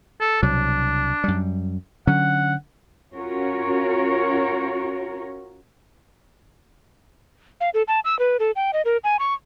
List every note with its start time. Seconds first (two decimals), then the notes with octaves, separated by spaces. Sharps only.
0.20 A4
0.43 C2 B2 F#3 D4
1.24 F#2 G3
2.07 D3 F#3 C#4 F#5
3.14 C#4 F4 F#4 A#4 C#5
7.61 F5
7.74 A4
7.88 A5
8.05 E6
8.19 B4
8.40 A4
8.56 G5
8.73 D#5
8.85 A#4
9.04 G#5
9.19 C#6